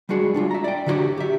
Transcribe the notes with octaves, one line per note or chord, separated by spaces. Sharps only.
G3 G#3 D4 F#4 G#4
G3 D4 F4
E5 A#5
D5 G5
D3 F#3 G3 D4 F#4 G4
G4 E5